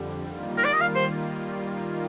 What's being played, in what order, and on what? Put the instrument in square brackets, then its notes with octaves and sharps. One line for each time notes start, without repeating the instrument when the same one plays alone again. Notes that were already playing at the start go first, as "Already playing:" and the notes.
Already playing: [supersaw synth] F2 D3 G3
D#3 G3 A#3 F4
[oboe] A#4
D5
D#5
F5
C5